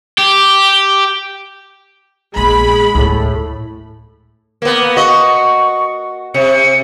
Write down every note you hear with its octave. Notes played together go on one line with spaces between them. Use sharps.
G4
A#1 G#3 B3 B5
D2 A2
A#3 B3
F#4 D#5 C#6
C3 C#7